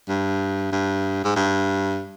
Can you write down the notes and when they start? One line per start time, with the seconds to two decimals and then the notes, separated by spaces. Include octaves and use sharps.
0.09 G2
0.72 G2
1.24 G#2
1.36 G2